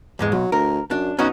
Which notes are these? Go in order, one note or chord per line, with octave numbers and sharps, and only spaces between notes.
E2 G#2 G#3
B1 F#3
D2 A#4
F#2 D4
B2 C#4 D#4 F#4